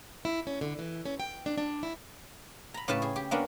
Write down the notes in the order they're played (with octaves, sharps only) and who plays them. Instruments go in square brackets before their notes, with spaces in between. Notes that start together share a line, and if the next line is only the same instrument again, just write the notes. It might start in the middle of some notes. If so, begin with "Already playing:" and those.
[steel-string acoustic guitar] E4
C#4
D3
E3
C#4
G5
D4
D4
E4
[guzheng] A#5 B5
A2 C#3 G4 B4 A5
G#4
G4
A#3 B3 C#4 D4 F#4